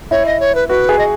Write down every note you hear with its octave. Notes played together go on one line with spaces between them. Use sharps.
E4 C#5
D#5
C#5
B4
F#4 B4
G#4
D#5